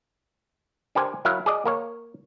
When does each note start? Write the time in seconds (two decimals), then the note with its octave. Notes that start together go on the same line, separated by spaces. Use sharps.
0.95 D4 G4 A#4 C5 G#5
1.25 F#3 E4 A#4 F5
1.46 G#4 D5 D#5
1.65 A#3 A#4 C#5